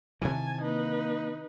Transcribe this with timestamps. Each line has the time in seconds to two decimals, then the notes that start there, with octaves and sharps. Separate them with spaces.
0.22 C3 D#3 E3 G#5 A5
0.62 A#3 D#4 B4